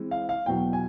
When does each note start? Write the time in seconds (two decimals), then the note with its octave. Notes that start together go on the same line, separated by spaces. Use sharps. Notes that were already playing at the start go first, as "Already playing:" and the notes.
Already playing: E3 G#3 C4
0.11 F5
0.29 F5
0.46 E2 B2 F#3 B3 G5
0.73 G#5